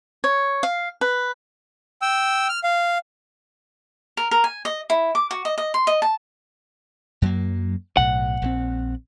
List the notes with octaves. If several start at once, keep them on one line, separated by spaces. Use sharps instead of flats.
C#5
F5
B4
G5 E6
F6
F5
A#4
A#4
G#5
D#5
E4
D6
F#4
D#5
D#5
C6
D#5
A5
F#2 F#3 A#3
B1 A2 F#5
A#1 E3 C4